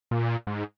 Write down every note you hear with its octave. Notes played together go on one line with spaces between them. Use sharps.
A#2
G#2